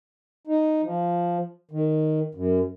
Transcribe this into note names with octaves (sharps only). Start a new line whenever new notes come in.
D#4
F3
D#3
F#2